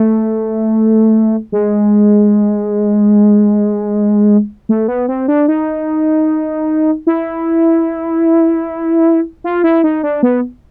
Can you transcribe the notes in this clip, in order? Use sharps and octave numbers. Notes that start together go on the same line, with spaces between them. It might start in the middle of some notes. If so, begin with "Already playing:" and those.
Already playing: A3
G#3
A3
B3
C4
D4
D#4
E4
F4
E4
D#4
D4
B3